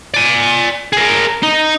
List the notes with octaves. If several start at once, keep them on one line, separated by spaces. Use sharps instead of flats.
D5 G#5
G#4 A#4
D#4